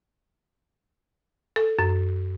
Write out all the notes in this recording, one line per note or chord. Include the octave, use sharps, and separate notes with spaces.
A4
F#2